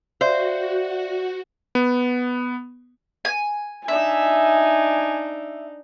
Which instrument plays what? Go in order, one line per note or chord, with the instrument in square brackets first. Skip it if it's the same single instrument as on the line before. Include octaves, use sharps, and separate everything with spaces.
[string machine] F#4 [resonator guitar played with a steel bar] C5 [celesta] D5 E5 F5
[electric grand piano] B3
[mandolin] G#5
[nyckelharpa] D4 D#4 [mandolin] E5 [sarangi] G#5